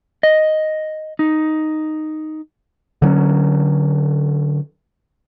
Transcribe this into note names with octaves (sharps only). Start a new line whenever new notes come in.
D#5
D#4
D3 F#3 C4 C#4